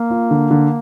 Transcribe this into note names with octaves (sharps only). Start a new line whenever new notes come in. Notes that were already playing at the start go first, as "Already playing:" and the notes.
Already playing: A#3
F4
D3
D3